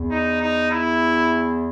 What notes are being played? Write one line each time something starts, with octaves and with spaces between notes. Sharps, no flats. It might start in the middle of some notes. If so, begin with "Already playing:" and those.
Already playing: E2
D#4
D#4
E4